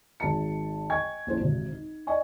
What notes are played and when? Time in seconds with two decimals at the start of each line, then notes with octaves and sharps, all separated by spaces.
0.20 G#1 D#3 G#4 A5 C#7
0.90 D#5 G5 G#5 C#6 G#6
1.27 A#1 F2 C#4 E4 C5
1.40 G#1 C3
1.72 D#4
2.07 D5 D#5 G#5 C#6